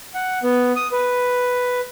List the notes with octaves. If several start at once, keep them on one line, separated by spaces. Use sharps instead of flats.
F#5
B3
D#6
B4